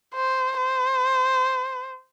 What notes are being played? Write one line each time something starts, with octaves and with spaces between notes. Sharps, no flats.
C5
C5